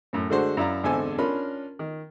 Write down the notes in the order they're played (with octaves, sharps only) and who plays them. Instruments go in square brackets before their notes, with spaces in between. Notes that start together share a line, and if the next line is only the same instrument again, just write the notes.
[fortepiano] F#2 A2
D3 G#3 A3 D4 F#4 C5
F#2 E4 D5 F5 A#5
G#1 E2 D3 A4 C5 G#5
C#4 D4 F4 A#4 B5
D#3